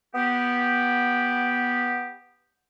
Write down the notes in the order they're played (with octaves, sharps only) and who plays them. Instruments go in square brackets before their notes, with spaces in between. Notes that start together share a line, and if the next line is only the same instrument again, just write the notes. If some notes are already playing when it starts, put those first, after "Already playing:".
[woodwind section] B3 G4